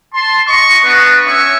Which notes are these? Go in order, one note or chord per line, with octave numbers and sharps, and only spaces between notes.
A5 C6
D#5 C#6
B3 D4 F#4 B4
C#4 C#5 E5 C#6